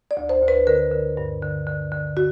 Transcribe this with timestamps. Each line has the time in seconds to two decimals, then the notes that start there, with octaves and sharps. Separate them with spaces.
0.11 D5
0.17 D2
0.29 C5
0.42 D2
0.48 B4
0.67 D3 A#4
0.92 D3
1.17 G2
1.42 D3
1.67 D3
1.92 D3
2.17 F#4